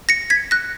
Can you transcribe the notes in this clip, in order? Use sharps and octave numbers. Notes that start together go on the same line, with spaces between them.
A#6 C#7
G#6 B6
F#6 A#6